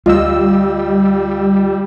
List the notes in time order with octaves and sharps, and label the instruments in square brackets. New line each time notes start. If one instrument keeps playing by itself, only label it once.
[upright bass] D2 [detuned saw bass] G3 [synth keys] F4 D#5 E6